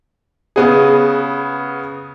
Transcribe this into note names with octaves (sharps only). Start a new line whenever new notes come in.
C#3 B3 G#4